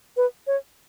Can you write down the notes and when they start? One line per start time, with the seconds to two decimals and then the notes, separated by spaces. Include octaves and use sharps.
0.17 B4
0.47 C#5